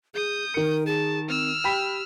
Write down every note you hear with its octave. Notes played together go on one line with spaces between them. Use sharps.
G#4 D#6 G6
D#3 A#4 C#7
G#4 A5
C4 E6 F6
G4 G5 B5 B6